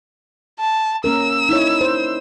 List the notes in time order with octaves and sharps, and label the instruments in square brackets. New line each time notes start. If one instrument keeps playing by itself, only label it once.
[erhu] A5
[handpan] A#3 C#4 A#4 [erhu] E6
[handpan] D#4 E4 C#5
C5